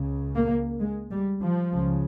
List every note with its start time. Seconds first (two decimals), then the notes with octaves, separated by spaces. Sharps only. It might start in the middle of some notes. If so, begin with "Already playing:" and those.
Already playing: C#2 C#3
0.35 A#3
0.80 G#3
1.11 G3
1.42 F3
1.72 C#2 C#3